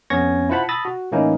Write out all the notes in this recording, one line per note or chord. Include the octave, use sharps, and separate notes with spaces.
F2 B3 C#4 C#6 G#6 A#6
E4 F4 C5 F#5 A5 B5
A5 B5 D#6 E6 A6 A#6
F#4
A2 E3 A#3 C#4 D#4 E4